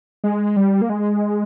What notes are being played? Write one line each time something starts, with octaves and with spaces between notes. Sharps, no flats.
G#3
G3
A#3
G#3